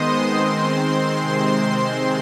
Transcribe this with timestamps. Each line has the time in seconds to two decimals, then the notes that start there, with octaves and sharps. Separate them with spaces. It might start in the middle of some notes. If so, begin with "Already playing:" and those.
Already playing: D#3 G#3 B3 C5 D#5 C6 D#6
0.28 D#3 G#3 C4 C5 C6
1.17 C3 D#3 G#3 C4